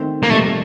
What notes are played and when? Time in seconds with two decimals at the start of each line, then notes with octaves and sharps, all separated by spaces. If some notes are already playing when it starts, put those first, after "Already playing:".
Already playing: D#3 A3 C4
0.23 A#3
0.30 F1 F2 C3 A3